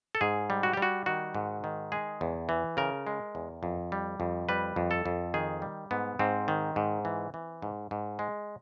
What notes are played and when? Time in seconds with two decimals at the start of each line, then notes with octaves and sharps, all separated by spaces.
0.15 A4
0.21 G#2 G#4
0.50 G3
0.63 F#4
0.73 G3 G4
0.82 F#4
1.06 D#3 F#4
1.35 G#2
1.64 D#3
1.92 G#3 G#4
2.21 E2
2.49 E3
2.77 C#3 A#4
3.07 G#3
3.35 E2
3.63 F2
3.92 G3
4.20 F2
4.49 G3 B4
4.76 F2
4.91 A4
5.06 F2
5.34 D#3 G#4
5.62 G3
5.91 G#2 B3
6.19 G#2 C4
6.48 D#3
6.76 G#2
7.05 E3
7.34 E3
7.62 G#2
7.91 G#2
8.19 G#3